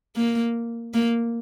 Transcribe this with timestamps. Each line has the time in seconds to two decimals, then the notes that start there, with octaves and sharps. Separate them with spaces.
0.16 A#3
0.94 A#3